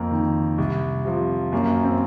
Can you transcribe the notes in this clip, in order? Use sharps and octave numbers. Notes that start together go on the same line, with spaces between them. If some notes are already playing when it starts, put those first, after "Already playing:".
Already playing: F2 A#3
D#3
C2
C3 F3
F#2 A#3
C4